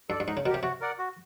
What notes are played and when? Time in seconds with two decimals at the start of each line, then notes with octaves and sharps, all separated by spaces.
0.09 G2 A4 D5
0.20 G2
0.28 G#2 D#4
0.37 C#3
0.45 B2 A#4
0.50 C3 G4
0.63 C3 F#4
0.81 A#4 D5 F#5
0.99 F#4